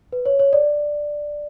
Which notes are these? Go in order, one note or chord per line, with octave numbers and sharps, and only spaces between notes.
B4
C#5
C#5
D5